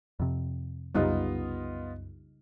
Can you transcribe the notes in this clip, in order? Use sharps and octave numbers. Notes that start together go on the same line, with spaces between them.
F2 C3
C2 F#2 C#3 G3 B3 D#4 F4 D#5